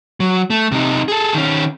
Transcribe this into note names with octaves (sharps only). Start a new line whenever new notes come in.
F#3
A3
C3 D#4
G#4 A4
D#3 C#4